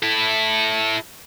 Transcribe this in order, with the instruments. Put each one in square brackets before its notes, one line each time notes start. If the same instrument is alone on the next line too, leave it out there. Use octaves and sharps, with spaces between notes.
[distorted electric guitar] E4 A4